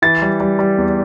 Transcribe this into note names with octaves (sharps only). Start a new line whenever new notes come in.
E3 A6
G3
G3
G3
E2